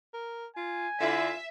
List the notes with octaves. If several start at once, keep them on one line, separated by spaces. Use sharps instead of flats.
A#4
F4 G#5
D3 E4 F4 E5